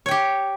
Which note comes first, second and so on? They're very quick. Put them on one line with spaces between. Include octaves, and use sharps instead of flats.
C#5 G5 G4